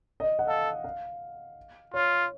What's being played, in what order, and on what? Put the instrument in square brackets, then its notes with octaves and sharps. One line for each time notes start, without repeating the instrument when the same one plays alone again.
[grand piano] D#5
F#5
[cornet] A4 [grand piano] F5
[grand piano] F5
[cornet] F4 [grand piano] C#5